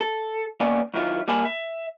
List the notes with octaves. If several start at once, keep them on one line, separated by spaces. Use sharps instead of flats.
A4
D#3 A#3 B3 C#4 D5 G#5
F#2 D#3 E4 F4
G3 A#3 A#4 G#5 A5 B5
E5